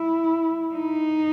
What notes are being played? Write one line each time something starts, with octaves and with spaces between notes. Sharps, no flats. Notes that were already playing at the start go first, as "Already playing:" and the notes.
Already playing: E4
D#4